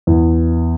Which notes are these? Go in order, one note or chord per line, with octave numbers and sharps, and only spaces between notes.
E2